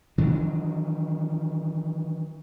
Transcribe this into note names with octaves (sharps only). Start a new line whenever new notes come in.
D#3 E3 F#3 D4